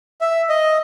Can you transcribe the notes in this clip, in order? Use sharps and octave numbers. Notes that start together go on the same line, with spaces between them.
E5
D#5